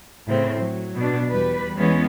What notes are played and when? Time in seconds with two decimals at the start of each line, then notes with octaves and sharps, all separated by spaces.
0.27 A2 C#3 C4
0.59 F#3
0.96 B2 D4
1.29 E2 G3 B4
1.76 E2 E3 G#3 B3 C#4